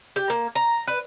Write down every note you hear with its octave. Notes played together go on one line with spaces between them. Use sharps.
G4
A#3
A#5
B4